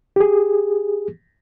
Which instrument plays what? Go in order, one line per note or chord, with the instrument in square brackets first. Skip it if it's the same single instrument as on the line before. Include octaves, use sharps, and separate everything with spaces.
[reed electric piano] G4 G#4